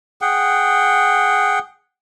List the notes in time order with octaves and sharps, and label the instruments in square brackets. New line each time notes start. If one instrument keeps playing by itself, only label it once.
[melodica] G#4 F#5 G5